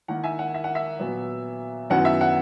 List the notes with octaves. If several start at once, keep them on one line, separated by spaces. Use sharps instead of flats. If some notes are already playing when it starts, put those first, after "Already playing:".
D#3 A#3 E4 F#5
E5 G#5
F#5
E5
F#5
E5
A#2 F#3 B3
F#2 D#3 F#3 B3 E4 F#5
E5
F#5